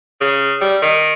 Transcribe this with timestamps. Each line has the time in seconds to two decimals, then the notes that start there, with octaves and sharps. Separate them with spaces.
0.21 C#3
0.61 G3
0.82 D#3